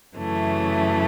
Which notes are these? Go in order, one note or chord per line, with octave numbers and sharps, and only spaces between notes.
F#2 C#3 E3 A3